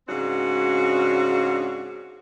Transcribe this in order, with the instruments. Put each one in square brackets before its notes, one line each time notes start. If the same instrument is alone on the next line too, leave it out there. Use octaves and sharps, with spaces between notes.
[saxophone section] G#2 C#3 C4 D4 F#4